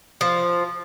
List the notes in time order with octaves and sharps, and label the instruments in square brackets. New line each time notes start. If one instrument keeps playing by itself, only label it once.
[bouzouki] F3